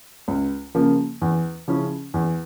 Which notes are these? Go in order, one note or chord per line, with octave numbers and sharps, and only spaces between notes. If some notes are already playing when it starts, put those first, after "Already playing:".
C#2
C#3 F3 A#3
E2
C#3 F3 C#4 E4
E2